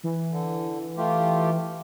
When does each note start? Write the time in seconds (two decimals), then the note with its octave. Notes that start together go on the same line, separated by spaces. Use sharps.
0.04 E3
0.31 D3
0.98 A3 F4 G4